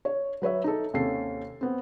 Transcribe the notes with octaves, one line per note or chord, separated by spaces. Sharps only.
C#5
F#3 B4 C#5 E5
D#4 A4
D#2 C3 C#4 A4 C7
B3 C4